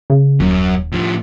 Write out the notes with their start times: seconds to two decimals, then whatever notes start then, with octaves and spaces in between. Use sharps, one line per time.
0.10 C#3
0.40 D#1 F#2
0.92 A2 F3